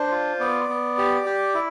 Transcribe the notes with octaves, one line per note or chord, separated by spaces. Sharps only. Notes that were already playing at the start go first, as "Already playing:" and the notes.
Already playing: D4 C5
F4
B3 D5
B3
G4
G4
E4